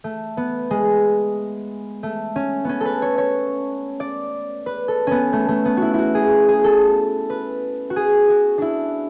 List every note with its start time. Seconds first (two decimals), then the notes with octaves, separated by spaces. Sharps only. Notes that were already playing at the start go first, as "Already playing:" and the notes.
0.04 A3
0.37 B3
0.71 G#3
2.03 A3
2.36 C#4
2.64 B3 C#4
2.81 A4 B4
3.02 C#5
3.18 C#5
4.00 D5
4.66 B4
4.88 A4
5.07 B3 C#4
5.33 A3
5.48 A3
5.65 B3
5.77 E4 F#4
5.94 E4 F#4
6.15 G#4
6.48 G#4
6.64 A4
7.30 B4
7.90 F#4
7.96 G#4
8.29 F#4
8.58 D4 E4